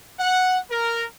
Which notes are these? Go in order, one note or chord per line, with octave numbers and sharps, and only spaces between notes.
F#5
A#4